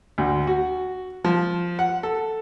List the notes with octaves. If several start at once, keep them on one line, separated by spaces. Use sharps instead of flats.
D2
F#4
F3
F#5
A4